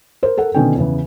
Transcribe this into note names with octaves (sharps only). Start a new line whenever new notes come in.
A#4 C5
A4 A#4 F#5
B2 D3 D#3 C#4 A4 G5
E2 C#3 E3